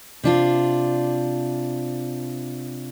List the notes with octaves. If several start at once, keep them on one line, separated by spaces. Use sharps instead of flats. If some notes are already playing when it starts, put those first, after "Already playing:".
C3 D4 F4